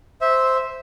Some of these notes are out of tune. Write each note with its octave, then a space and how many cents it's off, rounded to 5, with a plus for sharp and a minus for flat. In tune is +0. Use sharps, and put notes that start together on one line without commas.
C5 +0 E5 -10